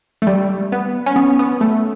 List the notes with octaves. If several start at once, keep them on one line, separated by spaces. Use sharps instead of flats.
A3
G3
B3
C#4
B3
B3
A3